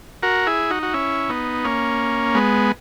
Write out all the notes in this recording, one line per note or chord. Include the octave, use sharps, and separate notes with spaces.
F#4 A#4
E4 G#4
D#4 F#4
F#4
C#4 E4
B3 D#4
A#3 C#4
G#3 B3